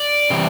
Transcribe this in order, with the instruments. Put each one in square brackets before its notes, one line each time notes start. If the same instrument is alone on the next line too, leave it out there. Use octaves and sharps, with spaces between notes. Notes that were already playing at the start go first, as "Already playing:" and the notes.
Already playing: [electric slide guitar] D5
C3 E3 G3